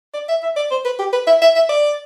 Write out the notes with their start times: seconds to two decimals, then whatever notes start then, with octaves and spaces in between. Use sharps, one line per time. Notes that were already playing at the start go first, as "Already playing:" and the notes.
0.14 D5
0.29 E5
0.43 E5
0.56 D5
0.71 C5
0.85 B4
0.99 G4
1.13 B4
1.27 E5
1.42 E5
1.56 E5
1.69 D5